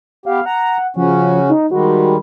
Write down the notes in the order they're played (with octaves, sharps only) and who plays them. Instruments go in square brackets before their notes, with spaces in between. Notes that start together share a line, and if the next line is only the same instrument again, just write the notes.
[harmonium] B3 G4 [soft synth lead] F5
[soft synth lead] F#5 [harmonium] A#5
[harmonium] C#3 C#4 F#4 [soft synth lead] F3
[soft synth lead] D#4
[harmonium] D#3 G3 G#3 [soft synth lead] F#4